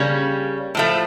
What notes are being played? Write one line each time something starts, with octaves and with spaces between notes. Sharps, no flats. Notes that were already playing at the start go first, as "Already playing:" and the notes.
Already playing: C#3 G3 A#3 C#4
A2 F3 A3